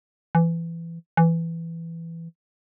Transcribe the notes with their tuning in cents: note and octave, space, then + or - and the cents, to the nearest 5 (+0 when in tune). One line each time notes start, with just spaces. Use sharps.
E3 +20
E3 +10